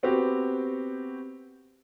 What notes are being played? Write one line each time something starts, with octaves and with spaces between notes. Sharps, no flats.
B3 C4 F#4 G4